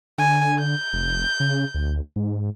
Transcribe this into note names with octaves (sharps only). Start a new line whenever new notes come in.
D3 G#5
G6
F1
C#3
D2
G#2